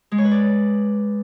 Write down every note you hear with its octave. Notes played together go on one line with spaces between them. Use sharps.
G#3
C#5
B4
D5